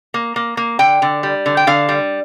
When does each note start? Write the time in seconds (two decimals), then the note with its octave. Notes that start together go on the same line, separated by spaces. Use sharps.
0.14 A#3
0.36 A#3
0.57 A#3
0.79 D3 G5
1.02 D3
1.23 G3
1.46 D3
1.57 G5
1.67 D3 F5
1.89 G3